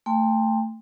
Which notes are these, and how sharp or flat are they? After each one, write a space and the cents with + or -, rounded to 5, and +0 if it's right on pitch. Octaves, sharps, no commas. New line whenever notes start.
A3 +15 G5 +30 C6 +0